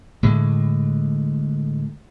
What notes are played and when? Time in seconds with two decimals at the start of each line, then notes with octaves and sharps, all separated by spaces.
0.23 A2 D3 G#3